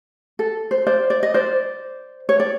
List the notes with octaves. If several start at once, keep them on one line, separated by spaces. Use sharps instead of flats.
A4
C5
C5 D5
D5
D#5
C5 D5
C#5
D5